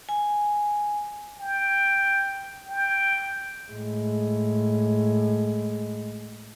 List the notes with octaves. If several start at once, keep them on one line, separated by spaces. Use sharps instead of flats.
G#5
G5
G5
A2 G#3